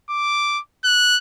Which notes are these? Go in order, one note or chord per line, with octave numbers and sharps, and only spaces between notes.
D6
F#6